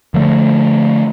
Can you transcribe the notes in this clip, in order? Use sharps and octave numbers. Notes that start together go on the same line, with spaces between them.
D3 F3 A3